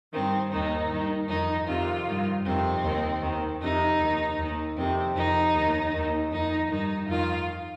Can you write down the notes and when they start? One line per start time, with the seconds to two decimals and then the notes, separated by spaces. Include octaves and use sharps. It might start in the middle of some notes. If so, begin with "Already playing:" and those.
0.13 G2 D#3 C4
0.51 D#2 D#3 D#4
0.90 G2 D#3
1.29 F2 D#3 D#4
1.67 F2 C3 D#3 F4
2.06 G2 D#3
2.45 F2 C3 D#3 C4
2.84 D#2 D#3
3.22 D#2 D#3
3.61 F2 C3 D#3 D#4
4.00 D#2 D#3
4.38 D#2 D#3
4.77 F2 C3 D#3 C4
5.15 F2 D#3 D#4
5.54 D#2 D#3
5.93 D#2 D#3
6.31 F2 D#3 D#4
6.70 G2 D#3 D#4
7.08 F2 D#3 F4